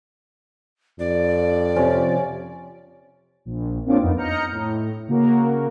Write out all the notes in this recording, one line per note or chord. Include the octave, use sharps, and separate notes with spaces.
F2 D5
C3 F3 C#4
A#1
A#3 C4 D4 F4 C#5 D6
F2 B3 D#4
D#5 A#5 F6 G6 C#7
A2
C#3 A#3 F#4 A#4